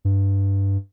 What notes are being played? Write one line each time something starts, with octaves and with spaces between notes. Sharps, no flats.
G2